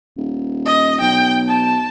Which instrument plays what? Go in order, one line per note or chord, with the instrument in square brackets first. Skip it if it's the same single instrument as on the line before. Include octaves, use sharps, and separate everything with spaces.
[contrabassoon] D#1
[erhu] D#5
[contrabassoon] B1 [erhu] G5
[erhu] A5